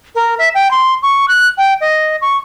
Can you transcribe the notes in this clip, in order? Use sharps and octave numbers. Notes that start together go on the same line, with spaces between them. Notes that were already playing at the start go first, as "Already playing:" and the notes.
A#4
E5
G5
C6
C#6
F#6
G5
D#5
C#6